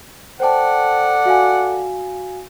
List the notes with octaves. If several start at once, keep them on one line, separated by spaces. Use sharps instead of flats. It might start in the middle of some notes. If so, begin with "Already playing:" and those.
A4 C5 D5 F#5 G5 A5
F#4 F5 G#5